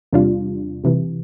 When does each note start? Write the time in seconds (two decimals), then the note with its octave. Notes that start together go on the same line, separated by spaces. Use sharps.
0.13 E2 C3 G3 D4 F4
0.84 C2 C3 E3